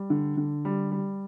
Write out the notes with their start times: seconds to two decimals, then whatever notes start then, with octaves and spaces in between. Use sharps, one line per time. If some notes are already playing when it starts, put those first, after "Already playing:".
Already playing: G3
0.10 D3
0.37 D3
0.65 G3
0.92 G3